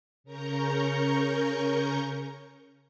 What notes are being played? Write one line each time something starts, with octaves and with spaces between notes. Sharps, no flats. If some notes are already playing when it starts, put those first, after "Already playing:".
C#3 C#4 A#4 A#5 C#6 G6